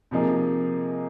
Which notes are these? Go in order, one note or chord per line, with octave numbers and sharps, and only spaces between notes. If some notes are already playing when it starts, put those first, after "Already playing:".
C3 F3 A#3 D#4 G#4